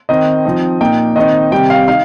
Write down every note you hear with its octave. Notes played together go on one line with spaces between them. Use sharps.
D#3 C4 D#4 D#5
F3 C4 D#4
A#2 A#3 D#4 G5
D#3 C4 D#4 D#5
C3 D#3 G3 C4 G5
F5
D#4 F5